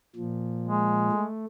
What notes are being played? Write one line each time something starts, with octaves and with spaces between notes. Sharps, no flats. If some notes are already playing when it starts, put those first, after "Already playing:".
A#2 F3
G#3
A3